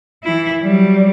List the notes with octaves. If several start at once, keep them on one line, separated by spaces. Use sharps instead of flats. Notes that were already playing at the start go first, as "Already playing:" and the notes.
E3 E4
F#3 G3